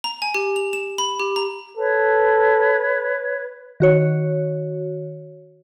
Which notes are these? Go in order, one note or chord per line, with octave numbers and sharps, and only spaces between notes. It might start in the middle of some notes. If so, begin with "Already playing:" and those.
A#5
G#5
G4
F7
E7
B5
G4
A#5
A4 B4 C#5
D#3 F#4 C#5